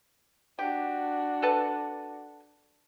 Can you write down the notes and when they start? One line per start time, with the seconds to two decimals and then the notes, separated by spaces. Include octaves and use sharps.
0.59 D4 F#4 G4
1.42 A4 B4 A5